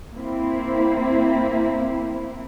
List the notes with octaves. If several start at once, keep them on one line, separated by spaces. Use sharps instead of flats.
A#3 C4 E4